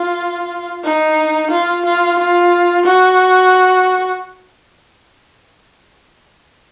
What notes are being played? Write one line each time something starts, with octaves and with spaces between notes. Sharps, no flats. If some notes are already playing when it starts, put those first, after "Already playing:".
Already playing: F4
D#4
F4
F4
F4
F#4